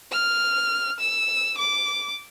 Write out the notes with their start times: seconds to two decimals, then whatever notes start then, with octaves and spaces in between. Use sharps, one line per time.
0.12 F6
1.00 E6
1.58 D6